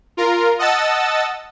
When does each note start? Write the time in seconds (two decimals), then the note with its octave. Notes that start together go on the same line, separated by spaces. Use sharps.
0.17 F4 A#4
0.59 D#5 F#5 A5 E6 A6